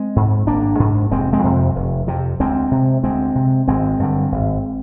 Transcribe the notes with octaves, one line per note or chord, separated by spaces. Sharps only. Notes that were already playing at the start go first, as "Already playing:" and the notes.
Already playing: G#3 C4
G#2
G#1 A#3 D4
G#2
F1 G#3 C4
G#3 C4
F2 C3
F1
F2 C3
D2 G#3 C4
C3
D2 G#3 C4
C3
G#1 G#3 C4
G2 D3
G#1